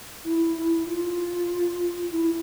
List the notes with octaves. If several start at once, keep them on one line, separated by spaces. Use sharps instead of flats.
E4
E4
F4
E4